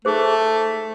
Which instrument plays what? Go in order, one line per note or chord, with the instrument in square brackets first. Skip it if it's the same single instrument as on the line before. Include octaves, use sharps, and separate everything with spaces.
[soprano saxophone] A3 [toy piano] D#4 G#4 C5